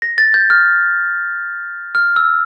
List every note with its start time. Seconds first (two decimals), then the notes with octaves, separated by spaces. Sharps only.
0.02 A#6
0.18 A6
0.34 G6
0.50 F6
1.95 F6
2.16 E6